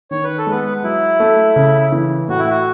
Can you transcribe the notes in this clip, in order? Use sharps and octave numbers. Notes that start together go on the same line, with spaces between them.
D#3 C#5
B4
A4
G#3 B3 B4
F#3 E4
A3
C#3
E3
A2 F#4
E4
F#4